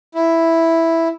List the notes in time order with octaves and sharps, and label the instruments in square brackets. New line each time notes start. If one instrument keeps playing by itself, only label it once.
[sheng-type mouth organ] E4